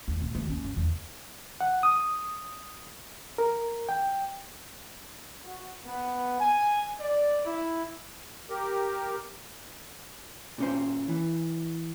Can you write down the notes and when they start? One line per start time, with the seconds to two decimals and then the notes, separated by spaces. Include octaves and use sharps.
0.08 D#2
0.22 A#2
0.35 D#2
0.50 C#4
0.64 F#2
0.77 E2
1.61 F#5
1.83 D#6
3.38 A#4
3.89 G5
5.42 F#4
5.85 B3
6.39 G#5
7.00 D5
7.45 E4
8.50 G4 A#4
10.58 A#2 C#4 C5
11.08 E3